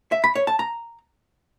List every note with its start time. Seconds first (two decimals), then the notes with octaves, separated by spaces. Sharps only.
0.12 E5
0.24 B5
0.35 C#5
0.47 A5
0.59 A#5